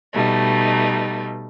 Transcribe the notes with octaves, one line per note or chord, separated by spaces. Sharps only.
B2 G3 A3 D#4